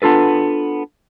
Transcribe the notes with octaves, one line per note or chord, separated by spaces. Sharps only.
B3 D4 F4 A4 B4